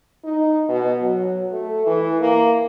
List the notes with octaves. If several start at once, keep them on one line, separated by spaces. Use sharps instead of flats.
D#4
B2
F#3
A3
E3
A#3